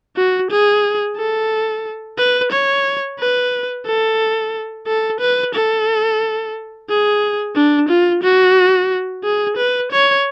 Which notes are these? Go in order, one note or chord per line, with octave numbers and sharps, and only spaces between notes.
F#4
G#4
A4
B4
C#5
B4
A4
A4
B4
A4
G#4
D4
F4
F#4
G#4
B4
C#5